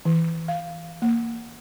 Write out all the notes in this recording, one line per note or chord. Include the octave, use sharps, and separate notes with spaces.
E3
F5
A#3